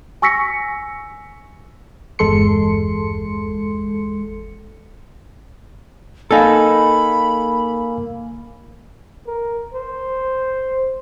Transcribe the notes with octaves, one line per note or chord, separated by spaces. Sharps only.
G#5 C#6 E6 A#6 B6 C#7
G1 E2 G#3 A4 C6 C#7
A#3 D#4 A4 F5 G#5 B5 E6
A#4
C5